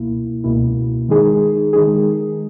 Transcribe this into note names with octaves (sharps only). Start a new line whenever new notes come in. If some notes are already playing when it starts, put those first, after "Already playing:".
Already playing: C#2 B2 A#3 E4
C#2 B2 A#3 E4
D#3 G#3 D#4 G#4
D#3 G#3 D#4 G#4